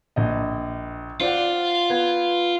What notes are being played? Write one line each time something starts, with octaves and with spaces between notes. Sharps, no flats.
A#1 D#5
F4 C5 D5 F#5
B3 G#6